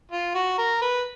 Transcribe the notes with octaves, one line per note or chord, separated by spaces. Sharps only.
F4
F#4
A#4
B4